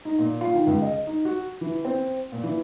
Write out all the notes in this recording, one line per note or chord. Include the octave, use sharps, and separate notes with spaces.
D#4
A#2
F4
D#3
C#2
D#5
D#4
F#4
E3
C4
A#2
E3